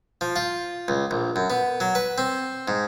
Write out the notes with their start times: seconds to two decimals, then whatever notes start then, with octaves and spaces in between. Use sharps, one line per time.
0.21 F3
0.36 F4
0.88 C#2
1.11 A#1
1.36 F#2
1.50 B3
1.80 F#3
1.95 B4
2.18 C4
2.68 G#2